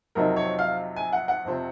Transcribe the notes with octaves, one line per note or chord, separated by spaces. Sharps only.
F2 C3 F#3 C4 D#4 A#4
C#5
F5
G#5
F#5
F#5
F2 C3 F3 C4